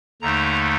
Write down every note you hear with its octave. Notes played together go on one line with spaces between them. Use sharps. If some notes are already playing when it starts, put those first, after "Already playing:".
D#2 D3 A3 D#4 A#5